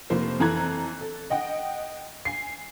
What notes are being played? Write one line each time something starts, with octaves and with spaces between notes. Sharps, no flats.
F1 F3 A#3 C5
F2 E3 A4 A#5 F#6 G#6
A4
D#5 F#5 G5
G#5 C7